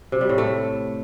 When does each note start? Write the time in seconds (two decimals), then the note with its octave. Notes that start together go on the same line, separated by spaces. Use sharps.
0.12 C3
0.21 G3
0.29 A2
0.38 A3